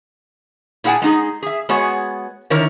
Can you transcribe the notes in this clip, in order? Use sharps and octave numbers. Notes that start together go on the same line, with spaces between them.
A#2 E4 G#4 F#5 G#5 A5
G#3 D#4 G#4
G#4 E5
G#3 B3 F#4 G#4 C#5 F#5
D3 D#3 E4 A#4 C#5